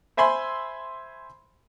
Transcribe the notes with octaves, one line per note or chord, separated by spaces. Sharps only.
C5 E5 G#5 B5 C6